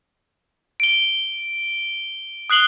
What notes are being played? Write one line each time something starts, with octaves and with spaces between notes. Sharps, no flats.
D7 G7
D#6 F#6 C7 F#7 G7